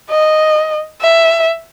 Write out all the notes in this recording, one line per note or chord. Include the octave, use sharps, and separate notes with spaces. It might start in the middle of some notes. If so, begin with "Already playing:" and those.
D#5
E5